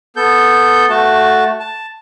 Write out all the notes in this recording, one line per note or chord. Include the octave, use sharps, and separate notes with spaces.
B3 A4 G6
A3 F#4 A5
A5